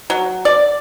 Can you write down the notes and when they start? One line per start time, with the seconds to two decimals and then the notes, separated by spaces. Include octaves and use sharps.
0.10 F#3
0.45 D5